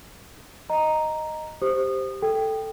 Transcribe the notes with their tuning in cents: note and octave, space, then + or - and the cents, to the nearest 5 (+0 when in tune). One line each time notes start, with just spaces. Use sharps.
D#5 -5 A#5 +0
G4 +0 C5 +0 D#6 -25
A4 +0 G5 +5